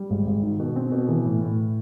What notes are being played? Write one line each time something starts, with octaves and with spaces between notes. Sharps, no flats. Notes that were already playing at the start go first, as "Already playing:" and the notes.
Already playing: G3
G#1
G#1
D#3
B2
C4
B2
E3
A2
A2